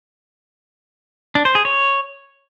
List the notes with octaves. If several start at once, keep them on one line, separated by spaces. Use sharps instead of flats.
D4
C5
G#4
C#5